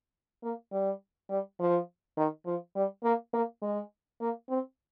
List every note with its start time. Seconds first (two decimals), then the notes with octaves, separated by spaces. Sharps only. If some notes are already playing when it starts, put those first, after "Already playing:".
0.43 A#3
0.73 G3
1.30 G3
1.60 F3
2.18 D#3
2.46 F3
2.76 G3
3.04 A#3
3.34 A#3
3.62 G#3
4.21 A#3
4.50 C4